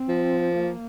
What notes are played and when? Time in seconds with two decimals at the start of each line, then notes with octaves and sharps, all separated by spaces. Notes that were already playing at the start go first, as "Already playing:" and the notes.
Already playing: C4
0.09 F3
0.54 A#3